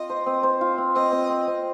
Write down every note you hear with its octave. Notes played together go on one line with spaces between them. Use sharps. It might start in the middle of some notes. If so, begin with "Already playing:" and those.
Already playing: C4 F4 D#5
C5
C4
C5
F4
C4
C4 D#5
C4
C4
C4